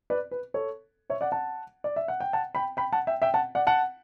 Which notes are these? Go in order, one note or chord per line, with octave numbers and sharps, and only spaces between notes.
B4 D5
B4
A4 C#5
C#5 E5
D5 F#5
F#5 A5
D5
E5
F#5
G5
F#5 A5
G5 B5
G5 B5
F#5 A5
E5 G5
E5 G5
F#5 A5
D5 F#5
F#5 A5